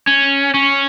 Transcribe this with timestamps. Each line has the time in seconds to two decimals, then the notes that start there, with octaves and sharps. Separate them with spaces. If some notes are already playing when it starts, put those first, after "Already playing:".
0.07 C#4
0.54 C#4